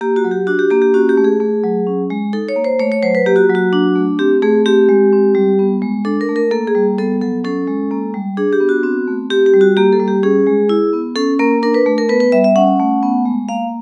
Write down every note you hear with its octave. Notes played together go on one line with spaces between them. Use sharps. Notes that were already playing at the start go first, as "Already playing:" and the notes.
A#3 G4
F#4
F#3
G4
D4 F#4
G4
A#3 G4
G4
C#4 F#4
G4
A3
G#4
A3
F#3
C#4
G#3
D#4 A4
C#5
A#3
C5
A3 C#5
C#5
F#3 C5
B4
A#3 G4
F#4
F#3
F#4
D4
A3
C4 G4
A3 G#4
C4 G4
G#3
C4
G3
B3
G#3
D4 A4
A#4
A3
A#4
A#3 A4
G#4
G3
B3 A4
F#3 A4
C#4 A4
G#3
A#3
G3
D4 G#4
G4
B3
F#4
C4
A3
C4 G4
G4
G3
F#4
A#3 G4
A4
G3
G4
C#4 G#4
G#3
E4
B3
C#4 A4
A#3 A#4
D4 A#4
B4
A3
A#4
B3 B4
B4
G3 E5
E5
C#4 F#5
A3
B3
G#3
A#3 F5